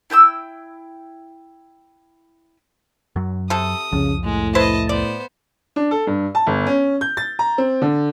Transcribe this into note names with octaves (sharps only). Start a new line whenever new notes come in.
E4 G5 G#5 E6
F#2 F#3
C3 A4 D#6
C2 F2 C#3 F3
A2 G#3
E4 B4 C5 D#5 A5
B3 C5 D5
D4
A4
G2
A5
G1
C#4
G6
A6
A#5
C4
D3